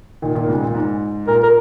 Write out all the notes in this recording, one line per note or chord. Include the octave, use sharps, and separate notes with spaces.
A#2 D#3
A#2 D#3
G#2 C#3
A#2
G#2
A#2 A#4
A#4